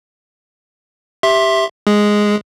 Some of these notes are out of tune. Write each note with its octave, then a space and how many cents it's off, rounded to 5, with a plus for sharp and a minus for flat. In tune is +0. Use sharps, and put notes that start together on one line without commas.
G4 +0 E5 +0 C6 +20
G#3 +0 G#4 +0